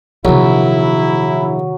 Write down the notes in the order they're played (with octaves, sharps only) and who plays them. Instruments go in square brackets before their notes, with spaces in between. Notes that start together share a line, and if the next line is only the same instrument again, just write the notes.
[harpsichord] A#1 [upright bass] C3 D#3 [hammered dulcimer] F#3 [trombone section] E4